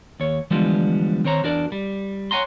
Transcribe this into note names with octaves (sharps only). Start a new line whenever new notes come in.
D#2 C#5
D3 E3 F3 G3 G#3 B3
D#3 C4 C5 C#5 A#5
E2 D4 F#4 A#4 D5
G3
C#5 F#5 G#5 A#5 C6